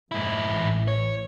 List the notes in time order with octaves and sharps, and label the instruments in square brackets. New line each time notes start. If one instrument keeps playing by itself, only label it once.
[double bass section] F2 [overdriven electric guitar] G#2 E4
[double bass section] A1 A2 E3
[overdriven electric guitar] C#5